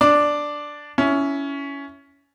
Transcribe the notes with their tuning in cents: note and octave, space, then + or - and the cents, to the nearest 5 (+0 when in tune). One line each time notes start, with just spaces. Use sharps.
D4 +0 D5 +0
C#4 +15 E4 +0